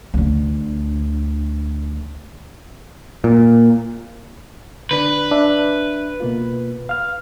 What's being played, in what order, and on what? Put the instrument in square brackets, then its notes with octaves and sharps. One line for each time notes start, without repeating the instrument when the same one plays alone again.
[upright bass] D2 D3
[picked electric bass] A#2
[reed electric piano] D3 D4 [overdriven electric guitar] B4
[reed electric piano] D4 E5
B2 A#3 F4
F5 F6